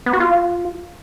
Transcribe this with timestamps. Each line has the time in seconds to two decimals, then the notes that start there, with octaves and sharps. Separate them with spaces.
0.06 B3
0.13 F#4
0.20 F4